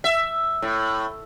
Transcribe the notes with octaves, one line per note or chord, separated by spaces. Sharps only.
E5
A2